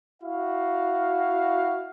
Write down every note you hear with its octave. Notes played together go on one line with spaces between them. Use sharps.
E4 F#4 F5